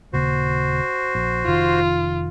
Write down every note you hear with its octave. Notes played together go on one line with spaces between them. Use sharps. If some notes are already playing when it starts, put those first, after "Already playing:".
D#1 C#3 A#3 F#4 C5
A#1
F1 D#3 F4